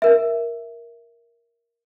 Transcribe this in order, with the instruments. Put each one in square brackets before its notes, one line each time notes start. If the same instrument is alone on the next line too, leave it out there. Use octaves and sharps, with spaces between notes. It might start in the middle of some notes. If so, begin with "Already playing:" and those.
[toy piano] A#4 E5